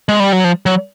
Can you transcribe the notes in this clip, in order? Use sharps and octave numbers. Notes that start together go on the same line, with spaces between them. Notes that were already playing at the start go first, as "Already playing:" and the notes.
G#3
G3
F#3
F3
F#3